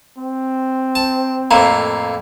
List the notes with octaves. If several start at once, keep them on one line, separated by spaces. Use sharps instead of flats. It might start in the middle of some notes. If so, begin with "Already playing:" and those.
C4
A5
F2 A2 A#3 A#5